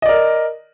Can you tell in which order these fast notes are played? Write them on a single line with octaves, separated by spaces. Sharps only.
D#5 D5 A#4